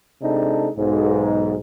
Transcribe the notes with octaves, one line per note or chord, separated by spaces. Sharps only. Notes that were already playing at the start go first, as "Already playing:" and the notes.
C3 G#3 D4 D#4 A4
B1 G#2